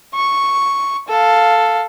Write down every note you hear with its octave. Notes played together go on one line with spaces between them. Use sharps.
C#6
A4 F5